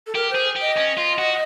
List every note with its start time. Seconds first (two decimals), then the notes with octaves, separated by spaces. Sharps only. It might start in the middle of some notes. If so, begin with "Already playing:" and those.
0.07 A4
0.15 G4 A#4
0.31 G#4 C5
0.56 G4 D#5
0.77 C#4
0.98 F4
1.19 F#4